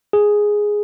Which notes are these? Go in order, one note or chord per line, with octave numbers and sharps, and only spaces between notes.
G#4